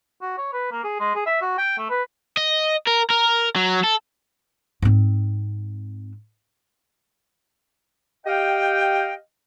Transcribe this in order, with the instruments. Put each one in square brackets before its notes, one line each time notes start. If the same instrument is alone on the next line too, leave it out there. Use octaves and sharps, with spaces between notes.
[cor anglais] F#4
C#5
B4
A#3
G#4
G#3
G#4
E5
F#4
G5
A3
B4
[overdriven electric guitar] D#5
A#4
A#4
F#3
A4
[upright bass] G#2 C4
[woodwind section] G4 D#5 F5 G5